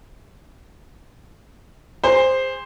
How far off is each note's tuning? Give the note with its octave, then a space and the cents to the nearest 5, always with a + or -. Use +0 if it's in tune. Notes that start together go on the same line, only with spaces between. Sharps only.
G#4 -35 C5 +0